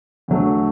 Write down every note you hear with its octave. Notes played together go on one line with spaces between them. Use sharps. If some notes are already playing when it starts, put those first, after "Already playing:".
E2 D3 F#3 A3